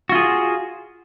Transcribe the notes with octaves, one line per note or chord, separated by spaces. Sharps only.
F4 F#4 G#4